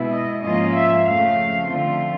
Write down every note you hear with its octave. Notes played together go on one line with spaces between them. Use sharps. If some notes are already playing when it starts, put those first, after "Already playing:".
Already playing: B2 G#3 B3 E4
D#5
G#2 F3 A#3 C#4 F4 D#5
E5
F2 C#3 F3 A3 F5
D3 F3 A3 C4 F4